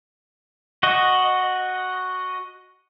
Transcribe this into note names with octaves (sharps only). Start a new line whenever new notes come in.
F#4 D#5